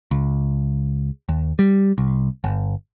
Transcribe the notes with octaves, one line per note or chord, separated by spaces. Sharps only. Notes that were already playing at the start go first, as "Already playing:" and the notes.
C#2
D#2
G3
C2
G1